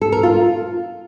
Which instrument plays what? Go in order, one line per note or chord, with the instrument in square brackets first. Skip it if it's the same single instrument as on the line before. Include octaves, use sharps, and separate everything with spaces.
[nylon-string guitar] A4
A#4
F4